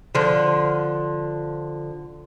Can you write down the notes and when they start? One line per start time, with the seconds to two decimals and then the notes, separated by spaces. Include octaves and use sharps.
0.15 D3 F3